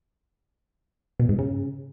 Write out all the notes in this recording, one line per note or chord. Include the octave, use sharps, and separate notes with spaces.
B2
G#2
C#3